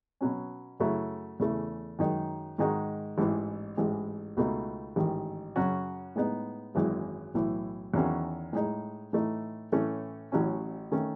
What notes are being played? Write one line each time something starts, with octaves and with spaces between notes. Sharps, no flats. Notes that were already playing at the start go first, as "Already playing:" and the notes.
B2 F#3 C#4
F#2 C#3 F#3 A3 E4
E2 C#3 E3 A3
F#2 D#3 G#3 D#4
G#2 D#3 G#3 D#4 F#4
A1 G#2 E3
A1 G#2 E3 G#3
C#2 B2 A3 D#4
A1 G#2 D#3
F#2 C#3 F#3 C#4 F#4
A2 G#3 B3 D#4
G#1 F#2 E3 G#3
B1 A2 E3
E2 D#3 F#3 C#4 F#4
A2 G#3 D#4
A2 E3 A3 D#4
A2 E3 A3 C#4
A1 A2 F#3 C#4 E4
D#3 A3 C#4